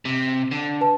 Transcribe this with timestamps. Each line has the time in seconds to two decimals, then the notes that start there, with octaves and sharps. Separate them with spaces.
0.05 C3
0.51 D3
0.81 B4 A5